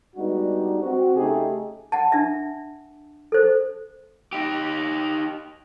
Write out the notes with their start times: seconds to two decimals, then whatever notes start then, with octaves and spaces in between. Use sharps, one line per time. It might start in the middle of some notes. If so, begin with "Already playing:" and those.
0.16 G3 G#3 B3 D4 D#4 F#4
0.80 C4 F#4
1.15 C#3 A3 D#4 G4 G#4
1.92 F#5 A5
2.12 D4 E5
3.32 A4 C5
4.33 D#4 G4